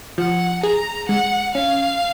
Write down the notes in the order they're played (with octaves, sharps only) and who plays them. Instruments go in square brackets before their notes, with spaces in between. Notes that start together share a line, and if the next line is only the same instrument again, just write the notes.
[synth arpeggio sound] F3 [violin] F#5
[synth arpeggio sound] G#4 [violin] A#5
[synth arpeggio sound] G#3 [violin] F#5
[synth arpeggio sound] C#4 [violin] F5